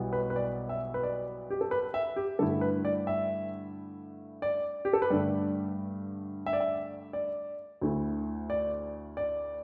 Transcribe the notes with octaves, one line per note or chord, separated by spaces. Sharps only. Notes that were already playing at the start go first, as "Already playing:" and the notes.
Already playing: B1 B2 G3 B3 E4
B4
B4
D5
E5
B4
D5
G4
A4
B4
E5
G4
G2 D3 A3 E4 A4
B4
D5
E5
D5
G4
A4
B4
G2 D3 A3 D5
E5
D5
E5
D5
D2 D3 A3 E4
D5
D5